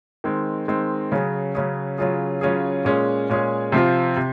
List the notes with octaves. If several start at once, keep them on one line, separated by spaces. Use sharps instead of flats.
D#3 G#3 C4
D#3 G#3 C4
C#3 F#3 C#4 G#4
C#3 F#3 C#4 G#4
C#3 F#3 C#4 F4 G#4
C#3 F#3 C#4 F4 G#4
A#2 G#3 C#4 G#4
A#2 G#3 C#4 G#4
C3 F3 C4 F4
C3